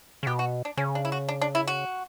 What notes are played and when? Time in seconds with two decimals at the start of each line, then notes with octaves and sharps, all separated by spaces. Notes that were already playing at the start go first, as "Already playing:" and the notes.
0.23 C#3
0.27 B2 G4
0.39 F#4
0.65 D4
0.77 C#3 C#4
0.95 D4
1.05 E4
1.12 F#4
1.29 D4
1.41 D4
1.55 E4
1.67 F#4